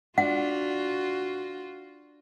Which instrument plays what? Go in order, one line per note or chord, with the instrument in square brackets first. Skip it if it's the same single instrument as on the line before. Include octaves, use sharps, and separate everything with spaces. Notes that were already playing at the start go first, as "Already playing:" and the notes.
[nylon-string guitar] D4 [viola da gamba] F4 F#4 [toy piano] F#5